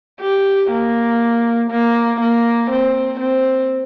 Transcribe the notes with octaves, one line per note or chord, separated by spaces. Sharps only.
G4
A#3
A#3
A#3
C4
C4